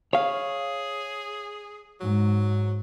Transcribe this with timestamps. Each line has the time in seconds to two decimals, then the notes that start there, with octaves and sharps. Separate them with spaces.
0.13 G#4 C#5 F5
2.00 G#2 F#3